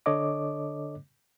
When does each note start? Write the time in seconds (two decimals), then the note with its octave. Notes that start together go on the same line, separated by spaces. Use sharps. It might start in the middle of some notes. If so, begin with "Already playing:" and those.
0.06 D3 D4 A4 C#5 D#5 D6